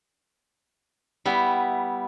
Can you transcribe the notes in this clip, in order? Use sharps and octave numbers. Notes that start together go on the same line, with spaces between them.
G3 B3 E4